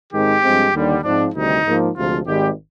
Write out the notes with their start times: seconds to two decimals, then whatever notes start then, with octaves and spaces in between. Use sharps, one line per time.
0.12 G#2 D#3 G#3 C4 G4
0.42 G2 F3 G#3 C4
0.73 D#2 D3 G3
1.03 G#2 F3 C4 D4
1.34 D2 C3 D#3 G3 D#4
1.65 G#2 F3 A#3
1.96 D2 C3 F3 G#3 F4
2.26 G#1 G#2 G3 G4